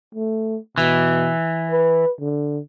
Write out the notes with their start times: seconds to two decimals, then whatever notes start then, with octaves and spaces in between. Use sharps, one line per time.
0.15 A3
0.78 B2 E3
1.72 B4
2.20 D3